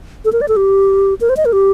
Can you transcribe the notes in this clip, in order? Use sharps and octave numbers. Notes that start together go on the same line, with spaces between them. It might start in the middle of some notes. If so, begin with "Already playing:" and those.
A4
A#4
D5
A4
G4
A#4
C5
D#5
A#4
G4